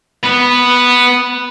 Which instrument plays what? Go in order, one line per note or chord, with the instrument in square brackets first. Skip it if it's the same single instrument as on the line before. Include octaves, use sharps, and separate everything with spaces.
[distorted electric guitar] B3